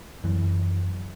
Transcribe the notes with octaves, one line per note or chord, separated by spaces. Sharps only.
F#2 E3